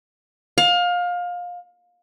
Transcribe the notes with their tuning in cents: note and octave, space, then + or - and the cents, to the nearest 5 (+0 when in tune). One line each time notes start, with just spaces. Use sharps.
F5 +25